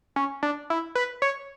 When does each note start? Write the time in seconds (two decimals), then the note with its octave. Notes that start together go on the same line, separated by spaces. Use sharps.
0.16 C#4
0.43 D4
0.70 E4
0.95 B4
1.22 C#5